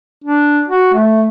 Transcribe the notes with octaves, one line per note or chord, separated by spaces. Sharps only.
D4
F#4
A3